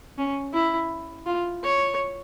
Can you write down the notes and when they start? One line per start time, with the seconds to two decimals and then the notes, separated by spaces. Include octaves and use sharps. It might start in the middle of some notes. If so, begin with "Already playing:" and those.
0.18 C#4
0.54 E4
1.26 F4
1.63 C#5